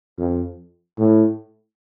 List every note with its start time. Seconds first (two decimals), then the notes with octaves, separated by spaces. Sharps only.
0.18 F2
0.99 A2